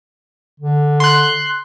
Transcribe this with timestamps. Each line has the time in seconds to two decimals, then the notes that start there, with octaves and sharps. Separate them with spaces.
0.60 D3
1.00 C6 F#6